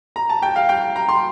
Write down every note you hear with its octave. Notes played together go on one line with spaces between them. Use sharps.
A#5
A5
G5
F5
G5
A#5
C6